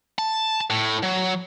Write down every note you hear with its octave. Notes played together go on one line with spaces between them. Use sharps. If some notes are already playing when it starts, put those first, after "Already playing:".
A5
A2
F#3